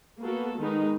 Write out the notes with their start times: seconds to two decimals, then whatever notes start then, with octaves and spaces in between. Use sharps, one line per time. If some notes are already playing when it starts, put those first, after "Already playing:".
0.22 A#3 B3 F#4 A4
0.58 D#3 G#3 B3 D#4